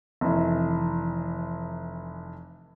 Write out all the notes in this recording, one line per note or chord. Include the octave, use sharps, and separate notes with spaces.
F1 E3